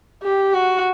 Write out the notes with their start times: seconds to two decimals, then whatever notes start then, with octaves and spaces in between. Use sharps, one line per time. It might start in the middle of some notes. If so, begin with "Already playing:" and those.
0.23 G4
0.54 F#4